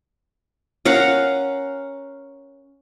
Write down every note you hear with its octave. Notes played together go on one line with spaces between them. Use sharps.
C#4 A#4 F5 F#5